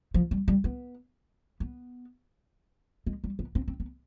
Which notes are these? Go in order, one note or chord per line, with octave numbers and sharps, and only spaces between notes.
F3
G3
G3
B3
B3
G#3
G3
B3
C4
C4
B3